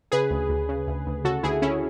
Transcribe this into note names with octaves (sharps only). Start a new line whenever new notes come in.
C#3 G#4 B4
D2
D2
C#3
D2
D2
C#3 F#4 A4
D2 E4 G#4
D2 C#4 E4